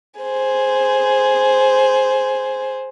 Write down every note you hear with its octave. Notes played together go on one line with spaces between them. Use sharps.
G#4 C5